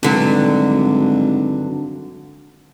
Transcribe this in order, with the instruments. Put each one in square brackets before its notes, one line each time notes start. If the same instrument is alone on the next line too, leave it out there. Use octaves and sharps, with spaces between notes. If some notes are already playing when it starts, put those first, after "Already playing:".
[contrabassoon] G#1 [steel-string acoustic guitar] G2 D3 F#3